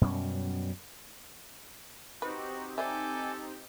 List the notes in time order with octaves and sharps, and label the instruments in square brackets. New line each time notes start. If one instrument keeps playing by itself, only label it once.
[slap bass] F#2 B2 G3 C#4
[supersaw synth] C4 D#4 G4 [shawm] F#4 [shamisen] B4
[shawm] A4 [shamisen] C5 D5 E5 [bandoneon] G#5 D6 G6